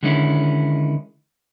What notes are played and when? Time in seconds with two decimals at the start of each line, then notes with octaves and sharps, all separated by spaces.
0.03 D3 D#3 G#3 C#4 D#4 E4